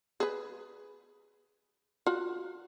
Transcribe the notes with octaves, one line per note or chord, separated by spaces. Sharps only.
G#4 B4
F4 F#4